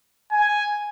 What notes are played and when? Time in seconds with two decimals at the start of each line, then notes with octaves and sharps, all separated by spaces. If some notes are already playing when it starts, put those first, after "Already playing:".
0.32 G#5